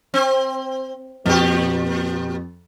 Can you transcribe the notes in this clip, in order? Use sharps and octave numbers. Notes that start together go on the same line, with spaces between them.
C4
F2 A#2 G4